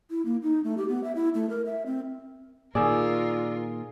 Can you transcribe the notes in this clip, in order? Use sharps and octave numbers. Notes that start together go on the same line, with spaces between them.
E4
A#3
D#4
A3
G4
B3
E5
E4
A3
A#4
E5
C4
A#2 D#3 F4 G#4 A#4 D5 G#5 E6